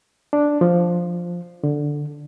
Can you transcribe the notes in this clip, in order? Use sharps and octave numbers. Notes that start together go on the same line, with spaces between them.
D4
F3
D3